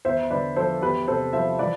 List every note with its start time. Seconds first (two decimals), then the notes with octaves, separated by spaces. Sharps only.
0.05 E2 C5 E5
0.30 D3 B4 D5
0.56 F3 A4 C5
0.82 E2 G4 B4
1.07 C3 A4 C5
1.33 F3 C5 E5
1.59 E3 B4 D5